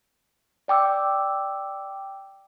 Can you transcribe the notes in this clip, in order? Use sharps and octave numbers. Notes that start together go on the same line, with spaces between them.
D5 G5 D6 E6